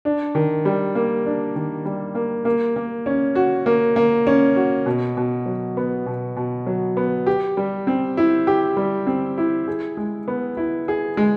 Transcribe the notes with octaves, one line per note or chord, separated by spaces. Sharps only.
D4
D#3
G3
A#3
D4
D#3
G3
A#3
A#3
A#3
C#4
F#4
A#3
A#3
C#4
F#4
B2
B2
F#3
B3
B2
B2
F#3
B3
G4
G3
C4
E4
G4
G3
C4
E4
G#4
G#3
B3
E4
G#4
G#3